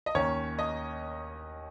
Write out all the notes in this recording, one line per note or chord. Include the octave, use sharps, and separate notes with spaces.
D#5
D#2 D#3 A#3 C#4 C#5
D#5